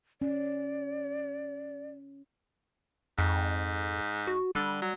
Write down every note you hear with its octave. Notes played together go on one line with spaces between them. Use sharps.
C#4 D5
F2 G#2
F#4
D3 G3
F#3